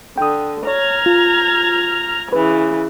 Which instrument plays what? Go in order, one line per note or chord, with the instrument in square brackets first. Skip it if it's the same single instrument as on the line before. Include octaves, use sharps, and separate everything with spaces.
[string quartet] D3 [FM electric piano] G5 D#6
[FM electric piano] C#5 [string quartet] A#5 F6 G#6
[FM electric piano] F4
[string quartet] C#3 E3 [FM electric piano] B4